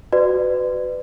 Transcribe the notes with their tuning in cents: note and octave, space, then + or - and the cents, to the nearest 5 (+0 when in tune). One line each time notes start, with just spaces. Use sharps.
F#4 +0 B4 +25 D5 +30